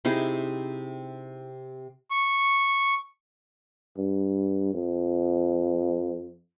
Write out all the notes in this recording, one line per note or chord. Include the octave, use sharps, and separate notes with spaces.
C3 D#4 E4 G#4
C#6
G2
F2